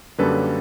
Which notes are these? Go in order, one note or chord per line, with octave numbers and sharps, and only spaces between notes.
F#2 D3 G3 A#3 C#4 A4 B4